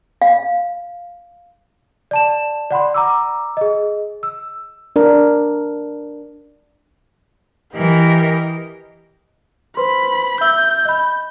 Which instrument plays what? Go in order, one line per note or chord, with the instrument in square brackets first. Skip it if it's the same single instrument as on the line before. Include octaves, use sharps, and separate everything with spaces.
[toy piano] F5
[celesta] D5 A5 E7
D5 F#5 B5 C6
A#5 D6 E6
G#4 D#5
E6
[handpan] D4 A#4
[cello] E3 A#4 [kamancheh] G4 D#5
[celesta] B4 C5 C6 [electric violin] B5
[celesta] E5 E6 G7 [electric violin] G6
[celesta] D#5 B5